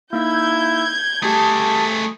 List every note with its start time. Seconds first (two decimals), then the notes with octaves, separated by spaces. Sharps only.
0.13 A#3 D#4 E4 E6 G6 G#6
1.22 A3 G4 G#4 A5 D#6